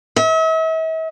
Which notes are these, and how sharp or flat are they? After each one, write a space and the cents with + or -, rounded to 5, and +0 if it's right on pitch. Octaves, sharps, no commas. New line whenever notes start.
E5 -45